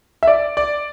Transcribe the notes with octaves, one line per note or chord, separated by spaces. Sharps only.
E5
D5
D5